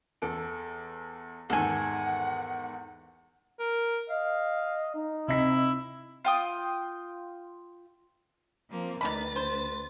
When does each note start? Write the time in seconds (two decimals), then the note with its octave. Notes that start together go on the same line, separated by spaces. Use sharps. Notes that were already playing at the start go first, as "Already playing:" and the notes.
0.22 E2 A4 D7
1.50 E2 G#2 D#3 A4 F#5 G#5
3.60 A#4
4.10 D#5 F5
4.95 D#4
5.28 C3 E4 D#5 B6
6.25 F4 G5 D#6
8.69 F3 A#3 C4
9.01 D2 D#3 D4 B4 B5 A6
9.36 C5